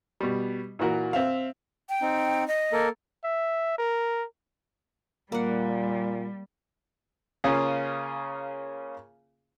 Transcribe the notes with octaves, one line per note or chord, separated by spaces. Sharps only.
B2 G3
A#2 E3 F#4 A#4
C4 E5 F5
G5
C4 D#4
D#5
A#3 A4 A#4
E5
A#4
A#2 G3 A#3 F#5
C#3 A#3 C#4 F4 G#4